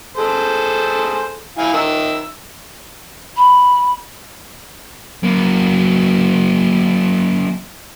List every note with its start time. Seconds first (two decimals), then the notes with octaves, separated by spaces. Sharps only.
0.17 G#4 A4 C5
1.58 E4 F5 G#5
1.73 D#3 E5 E6
3.37 B5
5.24 F#3 A#3